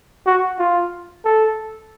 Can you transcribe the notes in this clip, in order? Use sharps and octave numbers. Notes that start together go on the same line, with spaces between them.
F#4
F4
A4